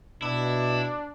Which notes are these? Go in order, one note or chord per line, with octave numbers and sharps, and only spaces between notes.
B2 D4 E4